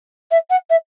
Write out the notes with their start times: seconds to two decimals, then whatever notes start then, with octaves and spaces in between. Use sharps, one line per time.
0.31 E5
0.50 F#5
0.70 E5